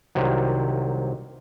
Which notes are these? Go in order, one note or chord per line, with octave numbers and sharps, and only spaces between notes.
C2 C3 D#3 F#3